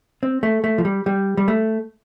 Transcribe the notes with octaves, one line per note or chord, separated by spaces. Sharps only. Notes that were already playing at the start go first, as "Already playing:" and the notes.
C4
A3
A3
F3
G3
G3
G3
A3